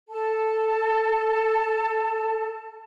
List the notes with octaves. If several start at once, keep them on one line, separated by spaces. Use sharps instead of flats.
A4 A5